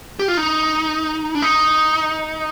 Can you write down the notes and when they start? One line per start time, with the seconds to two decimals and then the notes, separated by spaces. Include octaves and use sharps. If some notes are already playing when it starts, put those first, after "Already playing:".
0.19 G4
0.28 F4
0.37 D#4
1.35 D4
1.42 D#4